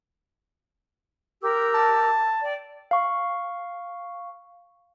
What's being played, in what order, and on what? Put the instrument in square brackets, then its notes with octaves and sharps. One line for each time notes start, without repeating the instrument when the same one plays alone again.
[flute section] G4 A#4 E6
[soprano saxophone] A5
[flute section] D5 G5
[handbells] F5 C#6